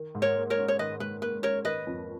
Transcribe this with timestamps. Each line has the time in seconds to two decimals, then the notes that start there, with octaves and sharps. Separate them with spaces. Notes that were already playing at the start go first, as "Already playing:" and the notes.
Already playing: D#3
0.15 G#2
0.22 A#4 C#5
0.36 A#3
0.50 A#4 C#5
0.58 C#4
0.68 C#5
0.79 D#3 B4 D#5
1.00 G#2 B4
1.22 A#3 B4
1.43 C#4 A#4 C#5
1.65 D#3 B4 D#5
1.87 F2